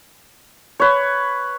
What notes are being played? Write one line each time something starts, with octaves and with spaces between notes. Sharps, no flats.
B4 C#5